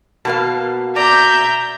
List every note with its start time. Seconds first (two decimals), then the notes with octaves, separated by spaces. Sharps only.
0.25 B2 A#3 F5 A5
0.96 D5 E5 A#5 G6